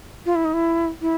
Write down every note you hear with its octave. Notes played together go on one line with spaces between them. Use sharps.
F4
E4
D#4
E4
E4